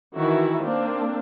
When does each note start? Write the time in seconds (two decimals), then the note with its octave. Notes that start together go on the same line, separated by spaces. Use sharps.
0.16 D#3 E3 E4 F#4
0.63 A#3 C4 D4